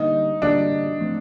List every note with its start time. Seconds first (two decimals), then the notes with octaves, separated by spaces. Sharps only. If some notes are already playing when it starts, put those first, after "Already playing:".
Already playing: D3 G3 A#3 D#4
0.42 D3 G3 A#3 D4
1.00 F3 A3 C4